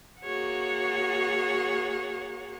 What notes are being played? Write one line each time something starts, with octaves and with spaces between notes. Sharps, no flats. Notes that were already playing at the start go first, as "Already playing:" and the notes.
A#3 F#4 G#4 C#5 F#5